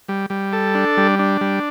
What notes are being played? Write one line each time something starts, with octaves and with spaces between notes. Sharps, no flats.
G3
G3
A4
D4
G3
D4
G3